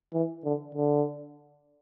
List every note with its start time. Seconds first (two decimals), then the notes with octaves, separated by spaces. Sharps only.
0.14 E3
0.44 D3
0.75 D3